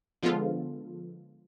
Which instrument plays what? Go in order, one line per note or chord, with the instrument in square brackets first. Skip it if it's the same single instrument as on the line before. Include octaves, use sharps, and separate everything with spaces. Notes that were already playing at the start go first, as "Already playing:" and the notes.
[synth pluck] D3 F3 G#3 B3 F4 A4